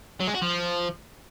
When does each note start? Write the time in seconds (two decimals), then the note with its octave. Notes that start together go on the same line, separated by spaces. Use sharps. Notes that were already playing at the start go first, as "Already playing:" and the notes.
0.20 F#3
0.27 G#3
0.35 F#4
0.42 F3